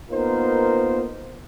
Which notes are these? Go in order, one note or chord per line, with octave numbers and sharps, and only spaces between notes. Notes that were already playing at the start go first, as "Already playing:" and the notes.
A#3 B3 D#4 F4 A#4 C5